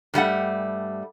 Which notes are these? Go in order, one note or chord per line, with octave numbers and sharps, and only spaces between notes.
G2 G3 A3 F#5